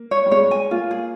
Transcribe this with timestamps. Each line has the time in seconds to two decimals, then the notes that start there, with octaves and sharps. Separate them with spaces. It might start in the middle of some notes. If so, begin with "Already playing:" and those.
Already playing: A#3
0.11 C#5
0.26 G3
0.31 G#3 C#5
0.51 G#5
0.71 A#3 F4
0.91 G#4